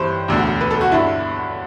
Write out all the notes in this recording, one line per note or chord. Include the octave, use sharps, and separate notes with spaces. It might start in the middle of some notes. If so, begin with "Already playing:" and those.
Already playing: G1 G2 E3 G4 C5
E1 D2 D3
B4
A4
F#4
G1 G2 D3 E4